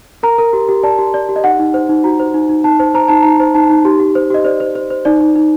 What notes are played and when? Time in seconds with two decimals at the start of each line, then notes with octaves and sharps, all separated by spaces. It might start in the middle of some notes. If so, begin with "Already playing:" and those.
0.23 A#4 A#5
0.38 A#4
0.53 G4
0.69 G4
0.83 D5 A5
0.99 G4
1.14 D5
1.29 G4
1.36 D#5
1.44 D#4 F#5
1.59 D#4
1.74 C5
1.89 D#4
2.04 F#4 A#5
2.20 C5
2.34 D#4
2.49 D#4
2.64 D#4 A5
2.80 C5
2.94 C5 A#5
3.08 D#4 A5
3.22 D#4 A#5
3.40 C5
3.54 D#4 A5
3.70 D#4
3.85 G4
4.00 G4
4.15 C5
4.30 G4 D#5
4.45 C5 D5
4.60 C5
4.75 C5
4.90 C5
5.05 D#4 D5
5.20 D#4
5.35 D#4